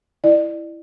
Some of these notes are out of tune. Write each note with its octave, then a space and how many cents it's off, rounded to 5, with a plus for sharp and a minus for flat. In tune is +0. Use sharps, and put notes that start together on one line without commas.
E4 +0 D5 +30